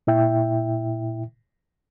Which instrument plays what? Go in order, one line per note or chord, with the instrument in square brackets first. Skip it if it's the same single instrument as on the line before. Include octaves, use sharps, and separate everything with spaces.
[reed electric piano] A#2 E4 E5 G5